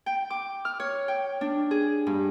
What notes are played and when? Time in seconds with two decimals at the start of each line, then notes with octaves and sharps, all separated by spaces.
0.06 G5
0.30 D6
0.65 F6
0.80 C#5
1.08 G5
1.41 D4
1.71 G#4
2.07 G2